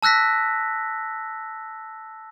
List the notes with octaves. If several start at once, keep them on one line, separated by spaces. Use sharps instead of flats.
A5 E6 F#6 A#6 B6